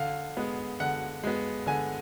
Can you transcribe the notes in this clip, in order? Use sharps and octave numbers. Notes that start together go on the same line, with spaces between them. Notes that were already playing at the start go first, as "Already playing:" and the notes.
Already playing: D3 F5
G#3 B3
D3 F#5
G#3 B3
D3 G#5